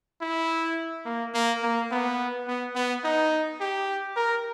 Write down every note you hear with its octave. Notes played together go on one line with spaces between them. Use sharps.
E4
A#3
A#3
A#3
B3
B3
B3
D#4
G4
A#4